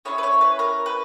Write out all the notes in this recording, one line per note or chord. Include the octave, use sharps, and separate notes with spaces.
C#4 E4 G#4 C#5
B4
C#5
B4
A#4
B4